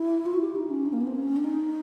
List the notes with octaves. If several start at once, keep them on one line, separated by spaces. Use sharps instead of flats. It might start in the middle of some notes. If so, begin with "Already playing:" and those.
Already playing: E4
F4
F#4
G4
D#4
C#4
D4
A#3
B3
C4
C#4
D4
D#4